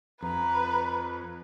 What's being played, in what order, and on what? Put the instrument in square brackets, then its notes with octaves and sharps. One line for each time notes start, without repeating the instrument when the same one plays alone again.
[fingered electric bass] F2 [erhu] B4 [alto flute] A#5